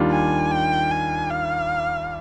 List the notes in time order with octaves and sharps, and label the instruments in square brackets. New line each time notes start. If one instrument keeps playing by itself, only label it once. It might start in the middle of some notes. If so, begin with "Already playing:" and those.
Already playing: [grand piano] D#2 D#3 G3 D4 F4
[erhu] G#5
G5
G#5
F5